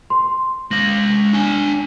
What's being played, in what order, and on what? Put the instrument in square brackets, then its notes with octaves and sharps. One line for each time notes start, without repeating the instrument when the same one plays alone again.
[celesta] C6
[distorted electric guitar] G#3 F5 [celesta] A#6 F#7
[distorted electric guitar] D4 G#5